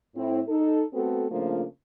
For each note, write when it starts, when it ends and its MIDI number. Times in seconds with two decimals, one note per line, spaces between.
0.16 0.41 45
0.16 0.41 60
0.16 0.41 64
0.48 0.84 63
0.48 0.84 69
0.94 1.26 57
0.94 1.26 59
0.94 1.26 60
0.94 1.26 66
0.94 1.26 69
1.31 1.64 49
1.31 1.64 53
1.31 1.64 57
1.31 1.64 58
1.31 1.64 62
1.31 1.64 65